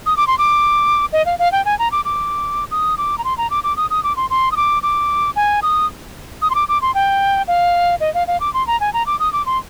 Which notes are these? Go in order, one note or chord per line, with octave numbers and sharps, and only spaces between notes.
D#6
D6
C6
D6
D#5
F5
F5
G5
G#5
A#5
D6
D6
D#6
D6
A#5
C6
A#5
D6
D6
D#6
D#6
D6
C6
C6
D#6
D6
D6
G#5
D#6
D#6
C6
D6
D6
C6
G5
F5
D#5
F5
F5
D6
C6
A#5
G#5
A#5
D6
D#6
D6
C6